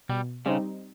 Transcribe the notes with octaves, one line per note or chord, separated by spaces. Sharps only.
B2 G3
C#3 G3 C4 D#4